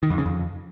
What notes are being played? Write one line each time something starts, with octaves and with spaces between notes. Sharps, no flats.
D#3
F2
C#3
F2